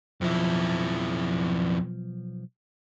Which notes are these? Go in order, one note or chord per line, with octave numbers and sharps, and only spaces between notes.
B1 F2 F3 E4